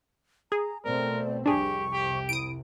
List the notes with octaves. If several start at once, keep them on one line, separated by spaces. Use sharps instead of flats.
G#4 A#5
B2 A3 C4 A#4 D5
C2 F2 C3 D4 G4 G#4 C#6
G4
E4 D#6 D7